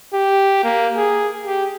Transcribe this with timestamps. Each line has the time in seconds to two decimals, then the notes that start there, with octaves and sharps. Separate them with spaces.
0.14 G4
0.64 A#3
0.97 G#4
1.45 G4